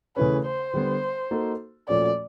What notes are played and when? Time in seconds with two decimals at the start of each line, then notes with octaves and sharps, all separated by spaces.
0.16 C#3 E3 A3 C#4 B4
0.46 C5
0.74 D3 G3 B3
1.31 A#3 D#4 F#4 A4
1.88 A#2 F3 A3 C#4 F#4 D5